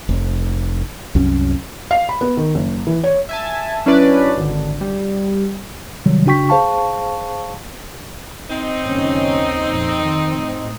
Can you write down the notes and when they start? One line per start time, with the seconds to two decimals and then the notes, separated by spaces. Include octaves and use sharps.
0.09 F1
1.15 C2 F#2 C#4
1.91 F5
2.09 B5
2.21 B3
2.37 D#3
2.55 F#1
2.87 E3
3.03 C#5
3.29 E5 G#5 A5
3.86 F#3 C#4 D4 E4 B4 D5
4.37 G#1 D3
4.81 G3
6.06 C3 D#3 F#3 G3
6.26 C#3 D4 F#4 G5 C#6 B6
6.49 G#4 C5 F5 A5 C#6
8.50 C4 D#4
8.84 F#1 D#2 C#4
9.69 F2 A#2
10.01 D#3
10.38 A2